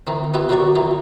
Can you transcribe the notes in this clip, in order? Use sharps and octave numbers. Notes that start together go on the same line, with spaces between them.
D#3 E3 C4
B3 E4 F4 G4 E5
C3 D#3 F#3 F#4 D5 C#6
D#3 E3 F4